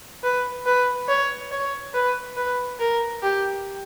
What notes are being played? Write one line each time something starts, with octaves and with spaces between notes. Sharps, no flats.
B4
B4
C#5
C#5
B4
B4
A#4
G4